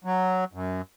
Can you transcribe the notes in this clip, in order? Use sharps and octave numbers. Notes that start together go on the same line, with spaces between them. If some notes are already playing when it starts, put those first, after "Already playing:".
F#3
F#2